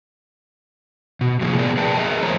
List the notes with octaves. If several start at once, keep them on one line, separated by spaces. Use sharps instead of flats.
B2
A2 C3 F3 A#3 G#4
B2 B3 G#4 A#4 D5
G#4 B4 D5 G5 A5
G#4 A#4 D#5 E5
F3 A3 C5 C#5 A#5